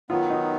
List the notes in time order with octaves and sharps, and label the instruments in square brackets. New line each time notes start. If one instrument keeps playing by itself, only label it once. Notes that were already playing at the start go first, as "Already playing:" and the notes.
[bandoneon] D#3 F#3 B3 [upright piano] F4
[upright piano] D#4